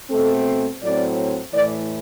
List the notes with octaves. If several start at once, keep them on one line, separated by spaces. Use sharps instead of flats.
B2 A3 C4 A4
A2 F#3 C4 D5
A2 E3 A3 D5